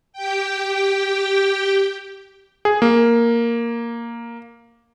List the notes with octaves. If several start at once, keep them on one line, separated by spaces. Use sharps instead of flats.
G4 G5
G#4
A#3